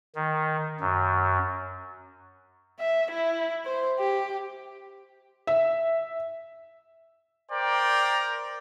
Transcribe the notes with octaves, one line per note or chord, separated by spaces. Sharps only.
D#3
F#2
E5
E4
C5
G4
E5
A#4 C5 D5 G5